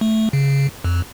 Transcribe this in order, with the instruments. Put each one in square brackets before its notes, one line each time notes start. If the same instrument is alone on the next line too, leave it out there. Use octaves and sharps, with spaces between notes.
[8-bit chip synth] A3
C#3
F2